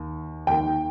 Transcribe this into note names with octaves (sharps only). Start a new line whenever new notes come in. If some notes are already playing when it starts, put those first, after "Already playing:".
Already playing: D#2
D#2 D#3 G5